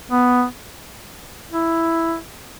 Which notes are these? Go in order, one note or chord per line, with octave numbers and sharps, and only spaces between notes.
B3
E4